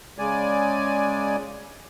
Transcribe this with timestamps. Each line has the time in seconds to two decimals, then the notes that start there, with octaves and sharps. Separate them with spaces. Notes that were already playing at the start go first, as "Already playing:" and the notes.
0.19 C#3 G#3 D5 G#5